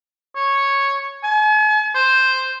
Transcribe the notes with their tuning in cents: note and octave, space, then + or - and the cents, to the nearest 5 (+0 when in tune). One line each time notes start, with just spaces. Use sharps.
C#5 -5
G#5 +45
C5 +0